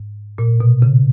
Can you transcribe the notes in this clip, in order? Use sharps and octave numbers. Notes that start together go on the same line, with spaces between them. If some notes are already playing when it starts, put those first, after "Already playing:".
Already playing: G#2
A#2
B2
C#3